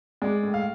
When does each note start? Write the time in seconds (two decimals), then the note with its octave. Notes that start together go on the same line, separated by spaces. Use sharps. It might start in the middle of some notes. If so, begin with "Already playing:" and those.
0.22 G#3 D5
0.43 A2
0.54 F5